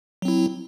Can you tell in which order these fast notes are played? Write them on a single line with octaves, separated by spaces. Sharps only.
F#3 C4 E4